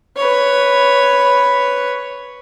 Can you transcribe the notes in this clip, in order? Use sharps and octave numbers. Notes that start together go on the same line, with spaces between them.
B4 C#5